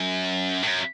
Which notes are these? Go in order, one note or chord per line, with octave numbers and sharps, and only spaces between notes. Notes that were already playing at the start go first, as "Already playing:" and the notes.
Already playing: F#2
A2
F#2